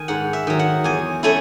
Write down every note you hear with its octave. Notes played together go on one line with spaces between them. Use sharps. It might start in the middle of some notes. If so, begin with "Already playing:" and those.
Already playing: D#3 G#5
G#2 F#5
E5
D#3 F#3
F#5
E2 G#5
A3 C#4 E4 G#5